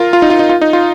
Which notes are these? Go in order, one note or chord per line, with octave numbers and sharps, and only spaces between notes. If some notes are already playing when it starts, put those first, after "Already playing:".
Already playing: F4 A#4
F4
D#4
F4
D#4
F4
D#4
F4